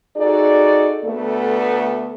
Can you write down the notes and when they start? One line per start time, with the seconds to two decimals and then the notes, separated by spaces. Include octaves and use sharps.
0.17 D#4 F#4 G#4 A4 D5
1.04 D2 A3 B3 A4